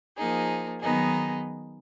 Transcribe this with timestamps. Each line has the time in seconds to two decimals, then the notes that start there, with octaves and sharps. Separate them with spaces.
0.17 F3 A#3 D#4 G#4
0.80 D#3 F#3 B3 D#4 G#4